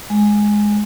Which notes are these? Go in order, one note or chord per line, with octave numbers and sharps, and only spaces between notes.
G#3